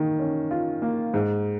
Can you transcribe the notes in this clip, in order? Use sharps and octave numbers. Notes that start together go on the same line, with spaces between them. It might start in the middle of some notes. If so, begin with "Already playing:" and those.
Already playing: D#3 A#3
C#4
F4
A#3
G#2